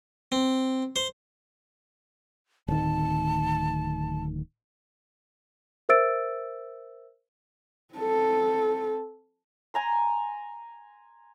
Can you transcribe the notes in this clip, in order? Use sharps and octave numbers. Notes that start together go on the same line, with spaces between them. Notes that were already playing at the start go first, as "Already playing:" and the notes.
C4
C5
D1 D#3 A5
A#4 C5 E5 E6 A6 D7
C4 A4
G#5 A#5 C6